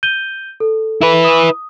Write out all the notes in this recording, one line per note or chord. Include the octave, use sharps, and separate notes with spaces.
G6 D#7 G7
A4
E4 B4
D#6